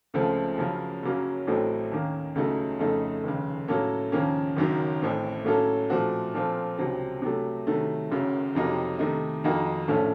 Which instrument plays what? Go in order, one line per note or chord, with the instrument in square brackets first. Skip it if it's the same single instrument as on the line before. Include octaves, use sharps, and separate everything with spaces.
[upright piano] C#2 C#3 F3 A3 C4
F#2 C#3 F3
F#2 C#3 F#3 A#3 C#4
A1 A2 F#3 A3 C4
D#2 D#3 A#3 C#4
C#2 C#3 F#3 A3 D#4
F2 C#3 A3 D#4
F1 D#2 C#3
A2 F#3 A#3 C#4 A4
D#2 C#3 F3 A#3 C#4
F#1 F#2 D#3 F#3
A1 A2 A3 C4
A2 F#3 A#3 C#4 A4
A#2 F3 A3 C4 F#4
A#2 F3 C4 F4 A4
C#2 C3 F#3 C4
C3 F#3 A3
C3 D#3 F#3 A3
F#1 F#2 C#3 F#3
F2 C3 F#3 A#3 D#4
C3 D#3 A3 D#4
F2 D#3 A#3 D#4 F#4
A#1 A2 F3 A3 C#4